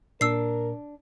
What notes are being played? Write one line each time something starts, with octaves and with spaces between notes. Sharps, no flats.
A#2 D4 A#4 E6 C7